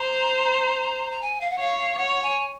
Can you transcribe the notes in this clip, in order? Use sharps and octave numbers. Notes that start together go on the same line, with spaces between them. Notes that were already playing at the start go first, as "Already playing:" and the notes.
Already playing: C5 A#5
A#5
G#5
F5
F#5
C#5 F5
F5
C#5 F#5
G#5